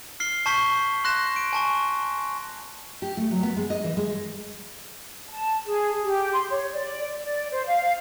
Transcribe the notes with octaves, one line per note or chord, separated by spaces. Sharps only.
F6 C7 G7
A5 C#6 G6 B6 C7 G7
C6 F#6 A#6 E7
D7
G#5 A5 C#6
G4
A3
F#3
B3
G#3
D#5
E3
G#3
A5
G#4
G4
C6
C#5
D5
D5
C5
F5